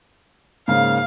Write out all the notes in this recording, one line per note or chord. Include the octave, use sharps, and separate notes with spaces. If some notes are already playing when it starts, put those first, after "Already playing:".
G#2 C#3 A#3 F5